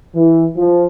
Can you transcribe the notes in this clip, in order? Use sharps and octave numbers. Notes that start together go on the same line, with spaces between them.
E3
F3